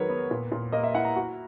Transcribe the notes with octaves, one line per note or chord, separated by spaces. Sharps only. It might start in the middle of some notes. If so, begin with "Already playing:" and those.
Already playing: D#3 F#3 G#3 A#4 B4 C#5
B3
A#2
A#2
A#3 D#5
E5
E4 F#5
A#5
F#4